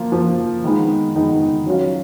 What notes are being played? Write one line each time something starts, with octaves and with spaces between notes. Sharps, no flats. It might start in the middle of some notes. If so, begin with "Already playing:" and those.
Already playing: F3 A#3 F4
F3 A#3 F4
D#3 G#3 B3 D#4
D#3 G#3 B3 D#4
F#3 C#4 F4